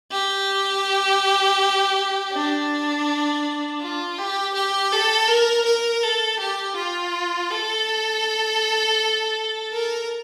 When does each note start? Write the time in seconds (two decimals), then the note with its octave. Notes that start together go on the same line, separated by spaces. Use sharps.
0.12 G4
2.33 D4
3.81 F4
4.18 G4
4.54 G4
4.92 A4
5.28 A#4
5.65 A#4
6.03 A4
6.40 G4
6.76 F4
7.51 A4
9.72 A#4